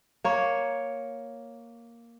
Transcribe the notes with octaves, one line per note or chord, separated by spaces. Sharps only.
A#3 C#5